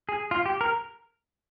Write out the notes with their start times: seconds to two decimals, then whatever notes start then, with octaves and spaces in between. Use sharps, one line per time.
0.09 G#4
0.31 F4
0.46 G4
0.61 A#4